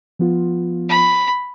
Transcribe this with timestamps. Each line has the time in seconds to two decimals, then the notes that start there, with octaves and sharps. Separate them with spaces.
0.19 F3 B3 F4
0.89 B5